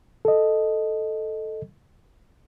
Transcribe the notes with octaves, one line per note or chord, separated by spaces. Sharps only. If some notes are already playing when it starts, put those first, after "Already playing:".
A4 D#5